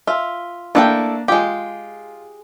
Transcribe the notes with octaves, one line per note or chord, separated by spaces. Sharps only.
F4 E5
A3 A#3 D4 E4 G5 A5
G#3 F4 G4